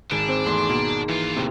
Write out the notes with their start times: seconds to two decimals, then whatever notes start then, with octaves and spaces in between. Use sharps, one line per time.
0.11 G#1 D4
0.29 C4 C5
0.46 E2 A3 C6
0.70 B2 A#3
1.09 G#2 E3 F4
1.36 D#2 A2 C3